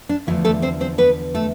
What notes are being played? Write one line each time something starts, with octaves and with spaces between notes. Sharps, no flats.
D4
E2 D3 F3 A3 D4 E4
A3 A4
C4 C5
C4 C5
B3 B4
A3 A4